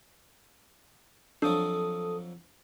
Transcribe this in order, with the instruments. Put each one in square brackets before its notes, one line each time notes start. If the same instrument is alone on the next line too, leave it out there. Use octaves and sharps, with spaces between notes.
[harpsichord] F2 F3 F#3 [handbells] D4 [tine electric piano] A4 D#6